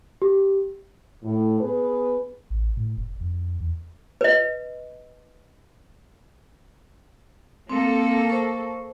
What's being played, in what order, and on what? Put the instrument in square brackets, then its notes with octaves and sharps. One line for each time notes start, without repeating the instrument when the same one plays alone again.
[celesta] G4
[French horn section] A2
B3 G#4 B4
[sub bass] A1
A2
F1
F2
E2
[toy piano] B4 D#5
[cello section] A#3 A4 [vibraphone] C4
[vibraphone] C5 C#6